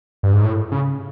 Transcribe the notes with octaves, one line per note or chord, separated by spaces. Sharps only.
G2
G#2
A2
C#3